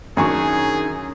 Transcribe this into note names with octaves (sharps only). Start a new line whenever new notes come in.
F#2 D#3 D4 G#4 G#5 C#6